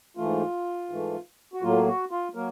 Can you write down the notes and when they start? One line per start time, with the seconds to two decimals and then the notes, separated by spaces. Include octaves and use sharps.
0.17 G#2 E3 A3 F4
0.90 G#2 E3 A3
1.54 F#4
1.63 A2 F#3 A#3 F4
1.88 F#4
2.11 F4
2.35 F#3 A#3 A#4